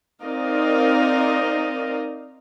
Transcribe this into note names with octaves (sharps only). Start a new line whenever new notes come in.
C4 D#4 A#4 D5 D#5 F5